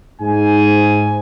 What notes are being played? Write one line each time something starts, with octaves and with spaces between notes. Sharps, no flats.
G#2 G#5